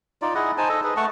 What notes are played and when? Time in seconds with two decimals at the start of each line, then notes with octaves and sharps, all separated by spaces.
0.22 D#4 F4 D5
0.35 E4 G#4 D#5 F#5
0.58 D#4 C5 G#5 A5
0.69 A4 D#5
0.84 G#4 B4
0.97 A3 F#5 A5 C#6